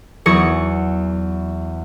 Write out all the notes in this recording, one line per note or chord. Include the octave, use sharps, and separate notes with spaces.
E2 F#3 G#4 C#6 A#6 C#7